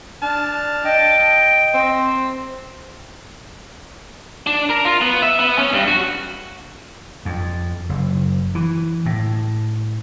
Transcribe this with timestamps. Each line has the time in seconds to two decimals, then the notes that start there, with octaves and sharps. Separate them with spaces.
0.22 D4 A5 F6
0.85 D#5 G5
1.74 C4
4.47 D4
4.70 A#4
4.85 F4
5.01 B3
5.22 E5
5.39 B3
5.58 C#4
5.73 G2
5.87 F#4
7.25 F2
7.89 F#1
8.55 E3
9.06 A2